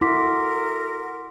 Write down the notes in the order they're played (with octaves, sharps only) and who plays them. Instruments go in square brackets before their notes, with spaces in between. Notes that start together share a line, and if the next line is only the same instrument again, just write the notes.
[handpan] E4 [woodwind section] F#4 A4 A#4 [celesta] C6 D6 B6